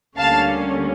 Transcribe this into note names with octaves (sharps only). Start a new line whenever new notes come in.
D2 D3 G3 A#3 C#4 F5 A5